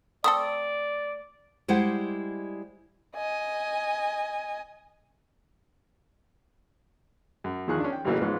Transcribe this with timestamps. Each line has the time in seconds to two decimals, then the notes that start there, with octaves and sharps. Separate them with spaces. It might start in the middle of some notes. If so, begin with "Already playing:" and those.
0.24 A3 C4 A4 D5 D#6
1.68 G3 G#3 E4 C5 D5 F#5
3.16 D#5 G#5
7.44 F#2
7.68 E2 D#3 F3 G#4 C#6 F#6
7.80 C#4 D4
7.93 G5
8.05 A1 C#3 E3 F#3 A#3
8.21 G#2 F3 B3 C#4